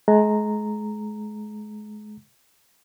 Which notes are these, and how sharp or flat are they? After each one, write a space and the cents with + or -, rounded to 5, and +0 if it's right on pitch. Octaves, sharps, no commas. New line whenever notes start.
G#3 +35 A#5 -10